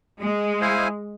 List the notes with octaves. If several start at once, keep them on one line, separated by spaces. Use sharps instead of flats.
G#3
E4 G#4 C5 F5 G#5